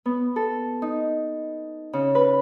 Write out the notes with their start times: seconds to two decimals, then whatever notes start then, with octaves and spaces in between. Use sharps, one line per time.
0.06 B3
0.36 A4
0.82 D#4
1.93 C#3
2.15 B4